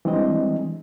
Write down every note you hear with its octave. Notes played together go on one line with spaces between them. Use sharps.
E3 G3 G#3 C4 D4 D#5